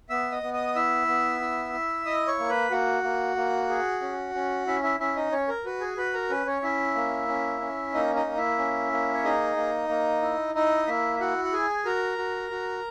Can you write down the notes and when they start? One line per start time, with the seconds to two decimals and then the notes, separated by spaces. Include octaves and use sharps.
0.09 B3 E5 E6
0.32 D#5 D#6
0.43 B3
0.54 D#5 D#6
0.75 E4 E5 E6
1.08 B3
1.41 E4
1.73 E4
2.06 E4 D#5 D#6
2.27 C#5 C#6
2.39 A#3
2.49 B4 B5
2.71 A#3 F#4 F#5
3.03 A#3
3.36 A#3
3.69 G#4
4.02 C#4
4.35 C#4
4.67 C#4 E4 E5
4.83 E4 E5
4.99 C#4 E4 E5
5.16 D#4 D#5
5.32 C#4 C#5
5.48 A#4
5.65 F#4 B4
5.81 G#4 G#5
5.97 F#4 B4 B5
6.14 A#4 A#5
6.30 C#4 B4
6.47 C#4 C#5
6.63 C#4 E4 E5
6.95 A#3
7.28 C#4
7.61 C#4
7.93 A#3 D#4 D#5
8.15 D#4 D#5
8.26 A#3
8.37 E4 E5
8.59 C#4
8.92 A#3
9.14 C#5
9.24 D#4 G#4 D#5
9.56 A#3
9.89 A#3
10.22 E4
10.54 D#4 E4 D#5
10.87 A#3 E4 E5
11.16 E5
11.20 E4 F#4 F#5
11.45 F#5
11.53 G#4 G#5
11.85 F#4 A#4 A#5
12.18 F#4
12.51 F#4